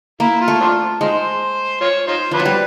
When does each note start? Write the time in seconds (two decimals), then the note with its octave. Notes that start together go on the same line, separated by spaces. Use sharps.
0.20 A#3 E4
0.41 F4
0.48 A3
0.61 C4 D4 F4
1.01 G#3 D#4 F4 C5
1.81 F4 C#5
2.07 D#4 F4 C5
2.31 F3 D4 E4 B4
2.39 F#3
2.45 G3